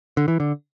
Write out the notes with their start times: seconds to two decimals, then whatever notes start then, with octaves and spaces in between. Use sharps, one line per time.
0.17 D3
0.28 E3
0.40 D3